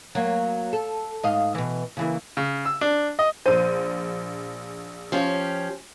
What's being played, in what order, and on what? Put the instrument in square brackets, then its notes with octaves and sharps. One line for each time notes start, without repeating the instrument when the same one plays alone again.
[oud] F#3 A#3
A4
G#2 D#5 F5
B2 E3
C#3 E3 A#3
[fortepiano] C#3
E6
D4
D#5
[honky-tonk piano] A#1 D#7 [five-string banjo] C5
[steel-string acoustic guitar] F3 C#4 G4